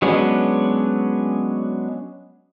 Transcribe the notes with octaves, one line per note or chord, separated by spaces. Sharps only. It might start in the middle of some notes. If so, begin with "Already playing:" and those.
F#3 G#3 B3 C#4 D4